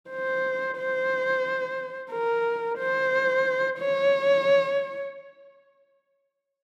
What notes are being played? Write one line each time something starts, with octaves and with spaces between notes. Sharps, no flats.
C5
C5
A#4
C5
C#5